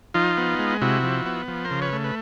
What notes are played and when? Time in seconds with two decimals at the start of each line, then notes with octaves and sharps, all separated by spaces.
0.14 F3 D#4 F4
0.37 B3
0.59 G#3
0.82 C3 E4 F#4
1.03 F3
1.26 B3
1.48 F3
1.65 A#4 C5
1.71 C#3
1.82 B4 C#5
1.93 A3
2.04 B4